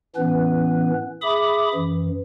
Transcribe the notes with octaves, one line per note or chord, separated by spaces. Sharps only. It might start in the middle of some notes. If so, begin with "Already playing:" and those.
A2 E3 B3 C#4 B4
G#4 E5 B5 D6 D#6
F#2 E3